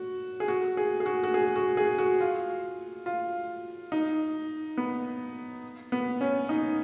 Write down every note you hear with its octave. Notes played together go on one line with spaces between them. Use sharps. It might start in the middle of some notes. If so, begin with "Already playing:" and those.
Already playing: F#4
G#4
F#4
G#4
G#4
F#4
F#4
G#4
F#4
G#4
F#4
F4
F4
D#4
B3
B3
C#4
D#4